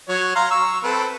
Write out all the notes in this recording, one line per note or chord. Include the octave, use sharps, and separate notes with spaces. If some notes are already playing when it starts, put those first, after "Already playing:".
F#3 C#5
F5 A#5 C6
C#6 E6
C4 A4 B4